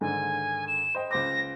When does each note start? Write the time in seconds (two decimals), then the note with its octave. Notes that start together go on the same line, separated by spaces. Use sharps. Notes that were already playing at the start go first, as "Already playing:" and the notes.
0.01 G#2 D3 D#3 G#5
0.68 E7
0.95 C5 D#5 G5
1.11 C#2 C5 D6 A#6